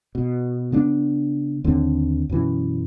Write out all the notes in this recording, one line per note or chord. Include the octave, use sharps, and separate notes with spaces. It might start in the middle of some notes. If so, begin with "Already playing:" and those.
B2
C#3 B3 D4
D#2 D3 C4
F#2 B2 E3 C#4